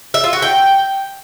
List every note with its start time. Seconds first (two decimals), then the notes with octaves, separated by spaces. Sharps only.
0.14 E5
0.24 F4
0.33 F#4
0.42 G5